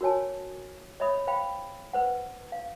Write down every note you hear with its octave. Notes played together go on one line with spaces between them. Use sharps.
F#4 A#4 C#5 G#5 A5
C#5 D#5 E5 B5 D#6
C5 F5 G5 B5
B4 C5 F#5
F5